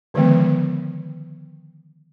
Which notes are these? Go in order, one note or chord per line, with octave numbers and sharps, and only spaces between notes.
D3 D#3 F3 G#3 B3